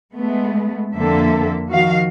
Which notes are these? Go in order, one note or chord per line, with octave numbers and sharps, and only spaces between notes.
G#3 A3 B3
F2 D3 A#3 C4 A4 E5
D#3 F3 F#4 F5